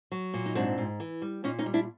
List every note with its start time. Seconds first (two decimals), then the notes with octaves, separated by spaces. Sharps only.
0.12 F#3
0.34 A#2
0.46 D#4
0.55 G#2 C4 D4
0.78 G#2
1.00 E3
1.22 G3
1.44 A#2 C#4 D#4
1.59 C#4 D#4
1.66 G3
1.74 D4 E4